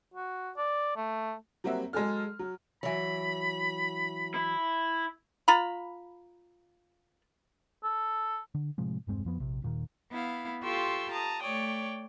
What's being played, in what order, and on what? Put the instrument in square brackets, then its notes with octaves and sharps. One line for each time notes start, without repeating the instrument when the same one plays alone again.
[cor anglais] F#4
D5
A3
[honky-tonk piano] F#3 G3 A#3 C4 F#4 E5
F#3 G#3 G#4 A4 F6
F#3
[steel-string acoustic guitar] E3 F#3 [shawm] B5
[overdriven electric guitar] E4
[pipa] F4 A#5 B5
[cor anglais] A4
[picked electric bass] D3
A2 C3 F3 G#3
E1 G2 G#3 C4
F2 F3 B3
A#1 C3
D#1 A#2 D#3
[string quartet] B3 E4 F5
F4 G4 A4 C6 C#6 E6
A5 A#5 D#6
A3 C#5 D5 G5